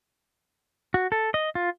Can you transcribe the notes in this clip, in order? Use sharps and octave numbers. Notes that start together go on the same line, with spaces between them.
F#4
A4
D#5
F4